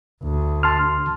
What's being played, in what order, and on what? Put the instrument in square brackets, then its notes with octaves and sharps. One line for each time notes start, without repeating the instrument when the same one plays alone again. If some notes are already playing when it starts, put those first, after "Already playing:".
[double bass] D2
[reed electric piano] A5 C6 F6